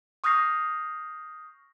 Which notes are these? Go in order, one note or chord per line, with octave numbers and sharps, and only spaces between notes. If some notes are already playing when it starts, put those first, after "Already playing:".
C#6 D#6 F6 G6 A#6 C7